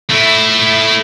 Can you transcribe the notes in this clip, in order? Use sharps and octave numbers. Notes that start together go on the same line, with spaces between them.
A3 E4